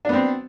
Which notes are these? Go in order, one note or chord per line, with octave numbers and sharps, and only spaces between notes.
B3 C4 D4